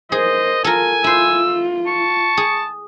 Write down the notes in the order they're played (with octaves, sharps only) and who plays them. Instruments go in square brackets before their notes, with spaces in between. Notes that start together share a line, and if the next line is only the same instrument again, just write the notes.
[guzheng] G#4 [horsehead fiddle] A#4 C5 [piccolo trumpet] D#5
[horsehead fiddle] F4 [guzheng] A4 A#4 [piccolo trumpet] G#5
[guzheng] E4 C5 [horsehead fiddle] F4 [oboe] E6
[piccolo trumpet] A5 [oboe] C#6
[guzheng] G#4